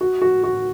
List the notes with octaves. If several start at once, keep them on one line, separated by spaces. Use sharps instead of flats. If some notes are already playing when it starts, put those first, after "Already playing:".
F#4
F#4
F#4